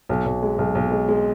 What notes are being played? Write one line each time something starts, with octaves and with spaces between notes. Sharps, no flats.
B1
B1
G#3
B1
B1
G#3
G#3